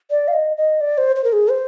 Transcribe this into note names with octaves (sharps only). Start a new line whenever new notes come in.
D5
F5
D#5
D#5
D5
C5
C5
A#4
G#4
C5